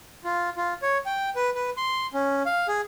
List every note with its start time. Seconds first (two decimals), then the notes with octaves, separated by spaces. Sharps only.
0.24 F4
0.57 F4
0.82 C#5
1.06 G5
1.36 B4
1.55 B4
1.77 C6
2.14 C#4
2.46 F5
2.68 G#4